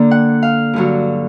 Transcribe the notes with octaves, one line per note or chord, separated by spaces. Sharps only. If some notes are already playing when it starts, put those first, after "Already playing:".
Already playing: D3 A#3 D4
F#5
F5
G2 D3 F#3